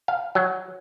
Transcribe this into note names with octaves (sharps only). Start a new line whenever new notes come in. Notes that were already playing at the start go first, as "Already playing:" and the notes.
F5
F#3